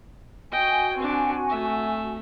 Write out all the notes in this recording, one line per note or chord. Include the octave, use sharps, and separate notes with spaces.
F#4 D#5 G5 G#5
C4 D4
A3 E5